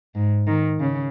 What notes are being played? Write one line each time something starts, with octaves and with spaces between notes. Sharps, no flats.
G#2
D#3
C#3